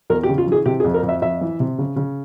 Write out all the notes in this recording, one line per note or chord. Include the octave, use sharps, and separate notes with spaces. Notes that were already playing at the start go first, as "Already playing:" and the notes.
E2 A#4
G4
C#3
F4
E3 G#4
C3 G4
G#4
F2
A#4
F2
E5
F2 E5
E3
C3
C#3
C#3